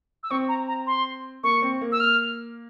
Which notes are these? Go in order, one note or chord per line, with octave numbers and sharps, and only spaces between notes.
E6
C4 C#6
A#5
A#5
C6
A#3 C#6
C4
A#3
E6
F6